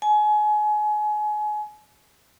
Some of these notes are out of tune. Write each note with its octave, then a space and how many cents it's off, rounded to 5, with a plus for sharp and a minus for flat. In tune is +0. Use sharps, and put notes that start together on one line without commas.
G#5 +30